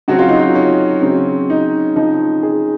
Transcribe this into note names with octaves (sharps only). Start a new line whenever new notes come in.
C#3 F#3 C4 F#4
F4
D#4
F4
C#4
C#3 F#3 C4
D#4
C#3 F3 C4 D#4
G#4